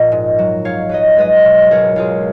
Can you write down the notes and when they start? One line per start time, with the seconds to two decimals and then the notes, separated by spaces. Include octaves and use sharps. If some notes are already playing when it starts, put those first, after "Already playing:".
Already playing: A#2 F3 D#5 F#5
0.12 G#2
0.38 F#3
0.65 G#2 C#5 F5
0.89 F#3 B4 D#5
1.17 G#3 B4 D#5
1.44 B2
1.71 C#2 A#4 C#5
1.96 C#2 F4 G#4